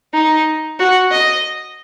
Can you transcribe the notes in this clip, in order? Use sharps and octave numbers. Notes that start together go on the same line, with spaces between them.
D#4
F#4
D#5